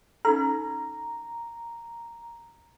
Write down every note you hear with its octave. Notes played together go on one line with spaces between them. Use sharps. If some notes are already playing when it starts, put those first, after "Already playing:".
C#4 D#4 A4 A#5